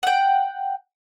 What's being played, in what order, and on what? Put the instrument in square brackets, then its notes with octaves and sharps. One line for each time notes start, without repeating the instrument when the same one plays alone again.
[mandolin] F#5 G5